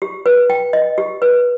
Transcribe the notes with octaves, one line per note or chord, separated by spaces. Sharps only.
G4
B4
G5
D#5
G4
B4